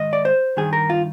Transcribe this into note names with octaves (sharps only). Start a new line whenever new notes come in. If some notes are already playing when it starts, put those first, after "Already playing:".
Already playing: G#2 D#3 D#5
D5
C5
G2 D#3 G#4
A#4
F4